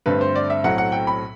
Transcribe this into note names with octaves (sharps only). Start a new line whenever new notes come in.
G2 D3 A3 C4 B4
C5
D5
E5
B1 A2 F#3 C4 F#5
F#5
G5
B5